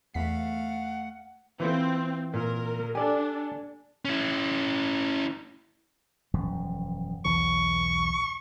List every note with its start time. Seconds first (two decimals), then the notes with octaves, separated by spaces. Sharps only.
0.14 E2 A3 F5 F#5 B6
1.60 E3 C4 E4 F4
2.34 A#2 A#4
2.95 D4 G4 A4 D5 G#5
4.05 C#4 E4
6.34 E1 F#2 F3
7.25 B1 E2 E3 C#6